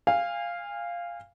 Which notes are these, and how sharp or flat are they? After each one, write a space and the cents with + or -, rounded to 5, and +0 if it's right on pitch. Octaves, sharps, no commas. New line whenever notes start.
F5 -5 G#5 -35